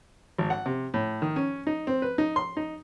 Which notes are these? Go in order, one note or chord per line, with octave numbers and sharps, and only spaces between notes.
G#1
F#5
C3
A2
D#3
C#4
D#4
C4
B4
D#4
C6
D#4